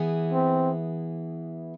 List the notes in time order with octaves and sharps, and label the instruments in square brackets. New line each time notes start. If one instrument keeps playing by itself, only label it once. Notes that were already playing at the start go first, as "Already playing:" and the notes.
Already playing: [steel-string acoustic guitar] E3 B3 E4 G#4
[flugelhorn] C4